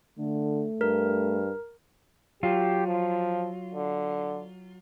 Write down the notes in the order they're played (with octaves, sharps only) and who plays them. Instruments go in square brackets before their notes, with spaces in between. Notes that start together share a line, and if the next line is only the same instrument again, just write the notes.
[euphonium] D3 [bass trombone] A3
[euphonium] G2 [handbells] A#4
[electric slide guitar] F#3 F4 [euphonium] G4
[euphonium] F3
D3